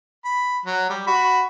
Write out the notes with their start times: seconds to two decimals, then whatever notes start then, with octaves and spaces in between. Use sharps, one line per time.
0.24 B5
0.66 F#3
0.90 G3
1.07 F#4 B5